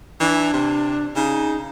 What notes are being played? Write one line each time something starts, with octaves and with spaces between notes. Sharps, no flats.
E3 D4
C3
C#3 D#4